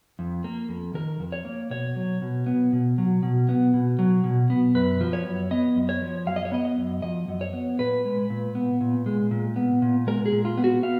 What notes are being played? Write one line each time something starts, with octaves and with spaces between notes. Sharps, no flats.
F2
A#3
F2
D#3 A#4
F2
C#5
A#3
B2 C#5
F#3
B2
B3
B2
F#3
B2
B3
B2
F#3
B2
B3
F#2 B4
F3
C#5
F#2
B3 D#5
F#2
C#5
F3
F#2 F5
D#5
C#5
B3 D#5
D#5
F#2
F3 D#5
F#2
C#5
B3
A#2 B4
G#3
A#2
B3
A#2
G#3
A#2
B3
A#2
G#3 A#4
G#4
A#2
F4
B3
F#4
B3 F5